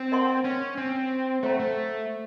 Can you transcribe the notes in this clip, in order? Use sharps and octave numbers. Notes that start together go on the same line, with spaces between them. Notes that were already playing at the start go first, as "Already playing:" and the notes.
Already playing: C4
A#4 D#5 F#5 A5 C6
C#4
C4
A3 C5 F#5 A#5
A3